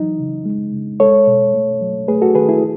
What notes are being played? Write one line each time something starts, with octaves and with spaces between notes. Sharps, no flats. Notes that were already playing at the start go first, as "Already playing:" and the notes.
Already playing: E3 F#3 D#4
C#3
G#3
C#3
G#3 A4 C#5
B2
A3
F#3
A3 G#4 B4
F#4 A4
D#3 G#4 B4
E4 G#4